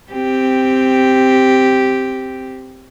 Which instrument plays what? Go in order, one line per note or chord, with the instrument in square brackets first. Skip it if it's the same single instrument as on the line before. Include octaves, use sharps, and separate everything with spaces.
[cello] C4 G4